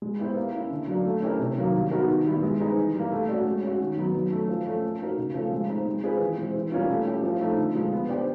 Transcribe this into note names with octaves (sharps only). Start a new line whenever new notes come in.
G#3
B3 E4 G4 C5
A#3
C#4 E4
D3
F#3 A#3 D4
A3
C#4 E4 G4 A#4
C3
D#3 F#3 A#3
G3
B3 D#4 F#4 A#4
D#3
G3 B3 E4
G#3
C4 D#4 G#4 B4
E3
G3 A#3
A3
C#4 F#4 A4 D5
G#3
C#4 F#4
D#3
F#3 B3 D#4
F#3
A3 C#4
F3
A3 C#4
A#3
D#4 F#4 A#4
C#3
F3 A3 C#4
G#3
C4 D#4
G#3
C4 F4 G#4 B4
E3
G#3 C4
E3
G3 A#3 C#4 F4
A3
C#4 E4 G4
F3
A3 C4 D#4
D3
F3 G#3
B3
D4 G4 C5